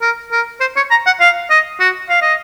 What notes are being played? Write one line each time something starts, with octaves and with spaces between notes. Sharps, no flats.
A#4
A#4
C5
C#5
A#5
F#5
F5
D#5
F#4
F5
D#5